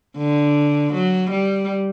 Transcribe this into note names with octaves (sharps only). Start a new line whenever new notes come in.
D3
F#3
G3